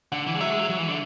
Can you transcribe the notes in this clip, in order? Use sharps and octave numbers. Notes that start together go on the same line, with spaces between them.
D3 F#5
E3
G#3
F#3 E5
G#3
F#3
F#3
E3
D3